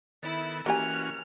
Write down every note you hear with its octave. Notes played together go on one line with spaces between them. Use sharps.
D#3 B3 E4 A4
E3 A#3 C#4 F#4 G4 G#5 F6